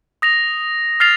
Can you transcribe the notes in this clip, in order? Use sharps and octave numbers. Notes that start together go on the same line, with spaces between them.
D#6 A#6 F7
F6 A6 C7 F7